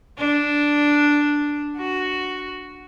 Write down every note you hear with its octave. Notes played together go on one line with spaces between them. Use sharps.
D4
F#4